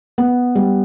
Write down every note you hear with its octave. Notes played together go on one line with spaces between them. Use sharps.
B3
G3